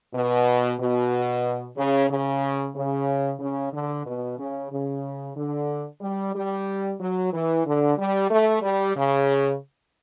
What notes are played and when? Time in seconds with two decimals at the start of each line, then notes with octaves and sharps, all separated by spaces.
0.14 B2
0.80 B2
1.77 C#3
2.10 C#3
2.75 C#3
3.40 C#3
3.73 D3
4.05 B2
4.39 C#3
4.71 C#3
5.36 D3
6.01 G3
6.34 G3
7.00 F#3
7.32 E3
7.65 D3
7.97 G3
8.30 A3
8.62 G3
8.96 C#3